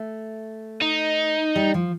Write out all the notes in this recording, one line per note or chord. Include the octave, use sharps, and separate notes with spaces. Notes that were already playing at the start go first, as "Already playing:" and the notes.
Already playing: A3
D#4
G3
F3